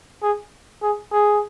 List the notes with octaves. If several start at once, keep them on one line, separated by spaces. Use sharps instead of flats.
G#4
G#4
G#4